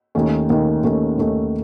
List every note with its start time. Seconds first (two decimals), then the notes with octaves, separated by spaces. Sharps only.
0.15 D#2 D#3 A3 C#4
0.50 D#2 D#3 A3 C#4
0.84 D#2 D#3 A3 C#4
1.18 D#2 D#3 A3 C#4